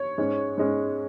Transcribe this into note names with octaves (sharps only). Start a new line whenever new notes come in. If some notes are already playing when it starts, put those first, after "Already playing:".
Already playing: C#5
G#2 G#3 C#4
G#2 G#3 C#4